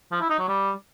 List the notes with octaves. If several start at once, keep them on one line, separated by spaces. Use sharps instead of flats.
F3
E4
D#4
F#3
G3